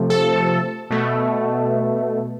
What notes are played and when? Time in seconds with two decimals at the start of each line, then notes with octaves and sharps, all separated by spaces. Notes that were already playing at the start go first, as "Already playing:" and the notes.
Already playing: C3 F3 A3
0.10 A4
0.90 B2 A3